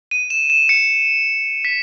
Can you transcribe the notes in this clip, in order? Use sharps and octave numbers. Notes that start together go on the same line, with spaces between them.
D#7
E7
E7
C#7
B6